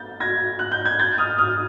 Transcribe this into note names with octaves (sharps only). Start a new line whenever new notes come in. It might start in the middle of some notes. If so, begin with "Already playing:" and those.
Already playing: G6 A6
G#6 A#6
F#6
G6
G#6
G6 A6
D#6 F6
D#6 F6